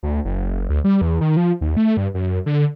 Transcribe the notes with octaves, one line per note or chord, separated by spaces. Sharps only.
D2
F#1
D2
G3
E2
D#3
F3
D#2
A3
G2
F#2
D3